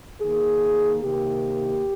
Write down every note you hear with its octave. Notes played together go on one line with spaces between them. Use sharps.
D#3 A#3 G#4
C3 D#3 A#3 G4